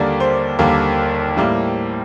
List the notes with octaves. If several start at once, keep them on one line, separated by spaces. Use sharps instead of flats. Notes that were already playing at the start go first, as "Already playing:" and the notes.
Already playing: D#2 D3 G3 A#3 D5
C5
D#2 D3 G3 A#3
A2 G3 A#3